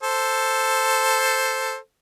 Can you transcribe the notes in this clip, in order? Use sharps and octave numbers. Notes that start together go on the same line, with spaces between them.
A4 C5